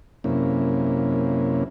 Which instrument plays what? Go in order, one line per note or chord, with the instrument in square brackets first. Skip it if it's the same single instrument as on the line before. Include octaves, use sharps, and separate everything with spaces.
[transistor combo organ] F#2 C3 A#3 C#4 E4